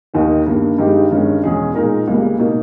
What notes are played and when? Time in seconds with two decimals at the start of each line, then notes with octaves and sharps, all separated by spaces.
0.14 D#2 D#3 A#3 D#4
0.47 G2 D#3 A#3
0.78 G2 D#3 G#3 D#4 G4
1.11 G2 D#3 G#3 C#4
1.43 E2 B2 G#3 C#4 G#4
1.75 A#2 G#3 D#4 A#4
2.07 C#2 C#3 G3 A#3
2.39 B2 A#3 D#4